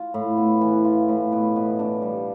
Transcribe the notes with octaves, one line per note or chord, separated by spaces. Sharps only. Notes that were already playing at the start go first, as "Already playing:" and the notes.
Already playing: F4
A2
B3
E3
F4
A2
B2
B2
D4
G3